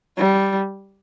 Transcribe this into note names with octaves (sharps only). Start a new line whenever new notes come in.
G3